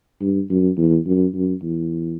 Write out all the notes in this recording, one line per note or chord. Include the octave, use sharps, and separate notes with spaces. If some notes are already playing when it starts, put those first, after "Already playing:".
G2
F#2
E2
F#2
F#2
E2